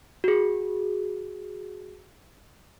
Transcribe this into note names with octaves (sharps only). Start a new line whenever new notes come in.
F#4 G#4